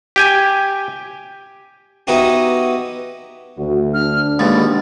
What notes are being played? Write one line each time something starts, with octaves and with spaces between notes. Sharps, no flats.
G4 G5 G#5
B3 D#4 E4 F#4 G4
D2 F#4
D4 F6
A#1 D#2 B2 G#3 A6